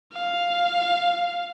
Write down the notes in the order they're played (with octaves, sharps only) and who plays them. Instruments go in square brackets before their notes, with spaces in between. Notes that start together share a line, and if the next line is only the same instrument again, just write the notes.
[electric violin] F5